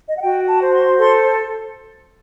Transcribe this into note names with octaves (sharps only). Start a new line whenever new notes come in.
D#5
F#5
F#4 G5
A5
C5
C6
A4 C6